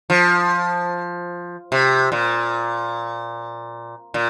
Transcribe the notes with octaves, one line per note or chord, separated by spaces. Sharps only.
F3
C3
A#2
A#2